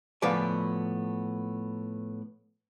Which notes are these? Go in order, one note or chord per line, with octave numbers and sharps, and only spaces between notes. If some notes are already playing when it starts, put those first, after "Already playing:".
A2 F3 B3 B4 D5 G#5